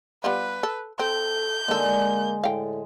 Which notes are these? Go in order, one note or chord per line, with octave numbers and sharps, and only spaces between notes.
G3 B3 F4 B4
A4
C4 A4 G6
D3 G#3 A#3 D#4 A4
A2 F5 G5